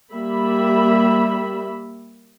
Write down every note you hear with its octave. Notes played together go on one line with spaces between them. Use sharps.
G3 A#3 E5 B5